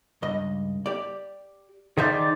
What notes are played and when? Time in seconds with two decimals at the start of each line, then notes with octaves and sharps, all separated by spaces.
0.22 C#2 G2 D#5
0.86 G4 D5
1.97 D#3 G#4 C5 D5 E5 F5